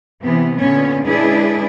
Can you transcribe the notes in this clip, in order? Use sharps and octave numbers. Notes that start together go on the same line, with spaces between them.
C3 E3 B3
A#2 D3 B3 C#4 C#5
G#3 C#4 D4 E4 G#4 B4